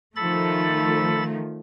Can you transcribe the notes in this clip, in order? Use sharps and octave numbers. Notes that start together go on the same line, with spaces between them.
D#3 F3 A3 A4 B5 A6